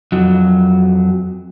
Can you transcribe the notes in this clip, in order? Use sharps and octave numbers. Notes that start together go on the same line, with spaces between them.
F2 F#3